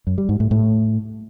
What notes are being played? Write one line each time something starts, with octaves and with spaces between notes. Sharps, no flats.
F#2
G3
G#2
A2
A2